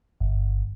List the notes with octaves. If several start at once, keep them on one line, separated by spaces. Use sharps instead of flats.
G1